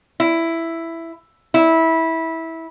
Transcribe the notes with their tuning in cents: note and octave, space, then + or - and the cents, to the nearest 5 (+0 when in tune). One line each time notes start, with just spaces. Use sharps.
E4 +5
E4 -20